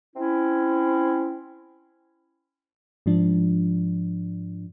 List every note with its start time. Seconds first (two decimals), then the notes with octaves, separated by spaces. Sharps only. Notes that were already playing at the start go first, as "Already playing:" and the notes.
0.16 C4 C#4 E4
3.06 G#2 F3 D4